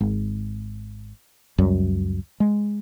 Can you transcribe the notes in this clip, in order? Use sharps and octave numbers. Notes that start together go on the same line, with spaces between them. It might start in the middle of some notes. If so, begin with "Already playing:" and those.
G#1
C#2 F#2 G3
G#3